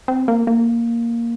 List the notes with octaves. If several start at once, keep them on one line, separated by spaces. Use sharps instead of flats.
C4
A#3
A#3